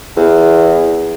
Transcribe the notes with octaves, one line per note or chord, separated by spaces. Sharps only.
E2